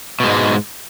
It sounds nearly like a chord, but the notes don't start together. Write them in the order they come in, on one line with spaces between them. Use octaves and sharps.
B2 G#3 G#2